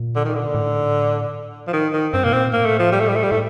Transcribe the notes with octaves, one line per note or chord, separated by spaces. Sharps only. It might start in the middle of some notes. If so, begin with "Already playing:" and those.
Already playing: A#2
D3
D#3
D3
A2
F3
D#3
D#3
G2 C4
C3 A#3
A#2 C4
A2 A#3
A3
F3
G3
A3
G3
A3
G3
A2 A3